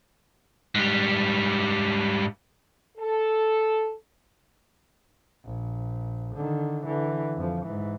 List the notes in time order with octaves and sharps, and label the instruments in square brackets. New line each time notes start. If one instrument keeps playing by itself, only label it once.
[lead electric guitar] G#2 G3
[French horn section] A4
[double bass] A#1
D3 D#3
D3 E3
F2 F3
G#2 E3